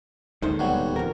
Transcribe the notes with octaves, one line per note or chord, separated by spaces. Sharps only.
D1 D#2 D3 D#3 G#3 C5
G2 B2 F#3
F2 A#4